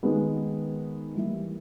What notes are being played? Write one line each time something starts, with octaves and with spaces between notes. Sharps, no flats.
D#3 G#3 B3 D#4
E3 G3 A#3 E4